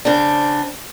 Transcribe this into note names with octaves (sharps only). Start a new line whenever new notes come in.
C#3 C4 D4